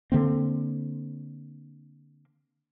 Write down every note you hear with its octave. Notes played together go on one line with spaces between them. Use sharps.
D3 A#3 C4